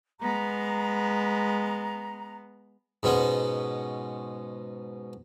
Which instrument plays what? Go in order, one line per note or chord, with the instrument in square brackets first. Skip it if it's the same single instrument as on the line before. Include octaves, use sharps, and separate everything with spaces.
[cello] G#3 B3 [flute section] A#5
[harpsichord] G#2 B2 B3 C#4